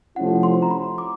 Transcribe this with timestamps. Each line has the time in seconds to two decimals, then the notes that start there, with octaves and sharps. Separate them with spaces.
0.16 C3 F3 A3 C#4 E4 F#5
0.43 C6
0.62 A#5
0.71 B5
0.98 D6